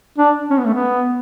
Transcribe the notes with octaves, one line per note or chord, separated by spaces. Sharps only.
D4
C#4
B3
A3
B3